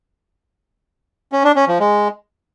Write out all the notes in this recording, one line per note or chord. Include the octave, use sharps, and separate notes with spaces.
C#4
D4
C#4
F3
G#3